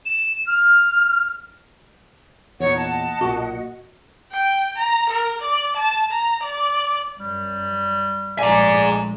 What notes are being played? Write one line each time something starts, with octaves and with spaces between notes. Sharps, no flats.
E7
F6
E2 A#2 D#4 C#5 F#5
D#5 F#5 A5
B1 A#2 F#4
G5
A#5
A#4
D5
A5
A#5
D5
F#2 G3
A#1 A2 G#3 D5 G#5 A#5